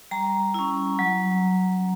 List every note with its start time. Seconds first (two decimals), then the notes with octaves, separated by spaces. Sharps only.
0.11 G3 A#5
0.54 C#4 E4
0.99 F#3